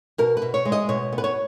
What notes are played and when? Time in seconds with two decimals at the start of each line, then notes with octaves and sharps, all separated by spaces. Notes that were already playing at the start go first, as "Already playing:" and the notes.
0.18 B2 A#4
0.37 B4
0.42 B2
0.54 C#5
0.65 G#3
0.72 D#5
0.89 B2 C#5
1.13 B3
1.18 B4
1.24 C#5